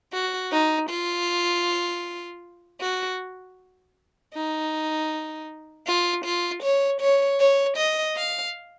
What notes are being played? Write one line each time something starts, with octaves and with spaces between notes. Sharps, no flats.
F#4
D#4
F4
F#4
D#4
F4
F4
C#5
C#5
C#5
D#5
F5